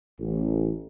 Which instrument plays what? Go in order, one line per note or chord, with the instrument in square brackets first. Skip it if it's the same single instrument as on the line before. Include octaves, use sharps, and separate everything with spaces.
[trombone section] A1